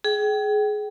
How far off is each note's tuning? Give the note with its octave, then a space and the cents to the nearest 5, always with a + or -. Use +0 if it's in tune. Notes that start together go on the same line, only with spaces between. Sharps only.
G#4 +20 G5 -25